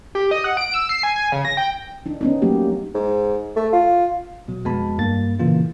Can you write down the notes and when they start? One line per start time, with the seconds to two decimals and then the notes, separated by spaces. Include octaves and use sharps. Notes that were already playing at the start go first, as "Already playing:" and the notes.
0.15 G4
0.31 D#5
0.44 F#5
0.57 D7
0.74 E6
0.89 C7
1.03 G#5
1.16 G#5
1.32 C#3
1.45 A#6
1.57 G5
2.06 D4 D#4
2.21 B3 C#4 D#4
2.42 F#3 A3 A#3 G4
2.94 G#2
3.56 A3
3.73 F4
4.48 B2 F#3
4.65 F2 G#3 B3 F#4 A5 B5
4.98 G2 A#3 A6
5.39 A#2 C#3 E3 A#3 F4